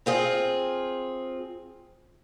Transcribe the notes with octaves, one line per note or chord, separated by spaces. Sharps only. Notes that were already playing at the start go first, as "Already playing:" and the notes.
C4 F4 G#4